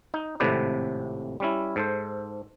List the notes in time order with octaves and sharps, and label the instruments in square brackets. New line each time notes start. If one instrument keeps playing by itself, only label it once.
[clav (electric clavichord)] D#4
G#1 A2 C3 A4 B4 D5
G3 C#4 E4
G#2 A4 C5